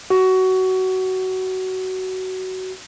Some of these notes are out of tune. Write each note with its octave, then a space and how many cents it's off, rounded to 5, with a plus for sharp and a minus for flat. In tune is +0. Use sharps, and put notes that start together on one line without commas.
F#4 +20